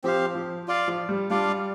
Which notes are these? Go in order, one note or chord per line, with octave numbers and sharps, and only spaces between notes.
F3 C4 G4 C5 F5
F3
F4 D5 F5
F3
G3
G3 D4 F4 D5 F5